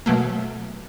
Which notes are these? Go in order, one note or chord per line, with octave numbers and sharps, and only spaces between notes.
B2 F#3 A3 A#3